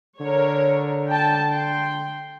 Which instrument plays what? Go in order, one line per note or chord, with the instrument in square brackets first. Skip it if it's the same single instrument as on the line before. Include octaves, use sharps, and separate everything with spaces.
[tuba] D3 [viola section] A#4 C#5
[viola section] G5 A5
G5 C6